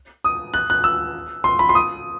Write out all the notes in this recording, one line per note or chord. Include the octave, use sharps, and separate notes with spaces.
D#6
F#6
F#6
E6
C6
B5
C6
D#6